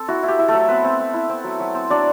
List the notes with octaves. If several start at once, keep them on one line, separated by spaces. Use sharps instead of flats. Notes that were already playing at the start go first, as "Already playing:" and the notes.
Already playing: C4 A4
E4 F#4
E4
G4
E4
A3 A4
F#3
B3 C4 B4
C4
C4
E4
C4
F#3
F#3
C4
F#3 D4 D5